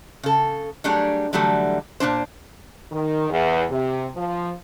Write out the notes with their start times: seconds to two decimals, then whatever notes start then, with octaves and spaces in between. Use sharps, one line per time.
0.23 C#3 A4
0.84 F#3 G3 A3 D4 G4 G#4
1.33 D3 E3 F#3 G3 A3
2.00 A#2 F3 D4 C5
2.92 D#3
3.29 E2
3.70 C3
4.15 F3